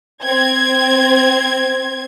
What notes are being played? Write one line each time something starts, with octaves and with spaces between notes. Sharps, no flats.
C4 G#6